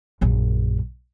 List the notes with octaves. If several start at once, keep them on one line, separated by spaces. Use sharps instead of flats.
A#1 F#2